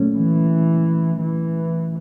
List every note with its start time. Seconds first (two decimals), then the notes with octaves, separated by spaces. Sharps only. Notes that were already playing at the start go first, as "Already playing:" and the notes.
Already playing: A#2 F#3 A3 C#4
0.16 E3
1.22 E3